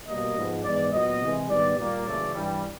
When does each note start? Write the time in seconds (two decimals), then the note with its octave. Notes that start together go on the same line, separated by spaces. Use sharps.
0.08 B2 G3 A#3 D#5
0.36 G#2 F3 G#3 B3
0.64 G#2 E3 G#3 B3 D5
0.93 A#2 F#3 B3 D#5
1.21 C3 E3 G#3
1.49 G#2 D#3 G3 B3 D5
1.77 A#2 G3 A#3 D5
2.05 F#2 C#3 E3 A3
2.35 G2 E3 G3